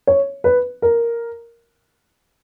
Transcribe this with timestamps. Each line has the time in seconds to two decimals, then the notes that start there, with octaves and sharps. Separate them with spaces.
0.07 C#5
0.44 B4
0.82 A#4